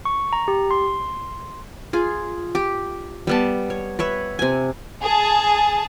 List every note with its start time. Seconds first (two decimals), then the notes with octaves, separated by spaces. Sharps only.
0.05 C#6
0.33 A#5
0.48 G4
0.71 C6
1.93 F4 G#4
2.55 G4
3.27 G3 B3 A5
3.70 C#5
3.99 B4 C#5 E5
4.39 C3 G#5
5.01 G#4 A5